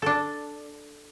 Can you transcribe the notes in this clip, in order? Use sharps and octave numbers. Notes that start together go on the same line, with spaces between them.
D4 A4